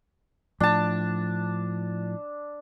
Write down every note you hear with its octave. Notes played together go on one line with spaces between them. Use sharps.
A2 F3 D4 A5